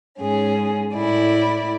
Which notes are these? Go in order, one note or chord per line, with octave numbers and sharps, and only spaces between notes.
G#2 C#4 G#4
A2 E4 D5